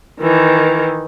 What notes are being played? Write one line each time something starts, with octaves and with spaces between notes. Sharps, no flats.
D#3 E3